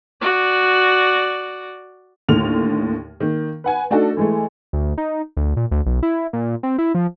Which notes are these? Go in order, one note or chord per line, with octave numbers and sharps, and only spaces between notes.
F#4 D5
D#2 A2 D3 F6 F7
D#3 A#3
B4 F#5 G#5
A3 D4 D#4 F#4 A4
E3 G#3 A3
D2
D#4
D2
A#2
D2
B1
E4
A#2
C4
E4
F3